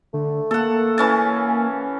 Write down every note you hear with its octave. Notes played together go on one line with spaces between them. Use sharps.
D3 A3
A#3 A4 F#5
E3 C#4 A5